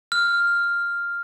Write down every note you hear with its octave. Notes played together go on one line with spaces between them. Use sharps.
F6